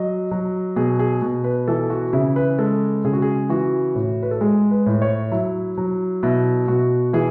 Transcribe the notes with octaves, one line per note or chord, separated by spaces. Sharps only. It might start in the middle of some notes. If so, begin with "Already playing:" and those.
Already playing: F#3 D#5
F#3
B2 G#4
G#4
B2
B4
E3 A4
F#4
C#3 E4
B4
G#3 A4
C#3 G#4
F#4
G#4
E3 F#4
A2
B4
A4
G#3 G#4
B4
A2
C#5
F#3 E4
F#3
B2 E4
B2 F#4
E3 G#4